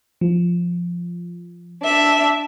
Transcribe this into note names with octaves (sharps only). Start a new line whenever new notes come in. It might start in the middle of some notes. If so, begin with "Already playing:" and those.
F3
D4 E5